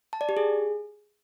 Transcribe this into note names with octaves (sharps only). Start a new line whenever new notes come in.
A5
D5
G4
G#4